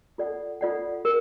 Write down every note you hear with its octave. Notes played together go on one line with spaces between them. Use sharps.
F4 A4 D5 F#5
F4 A4 D5 F#5
A#4